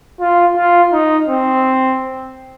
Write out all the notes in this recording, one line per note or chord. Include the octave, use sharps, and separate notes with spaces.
F4
F4
D#4
C4